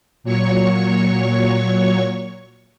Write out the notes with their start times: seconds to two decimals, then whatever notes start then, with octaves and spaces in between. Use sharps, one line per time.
0.24 A#2 F#3 C#5 C#6